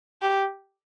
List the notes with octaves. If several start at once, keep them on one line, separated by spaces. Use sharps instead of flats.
G4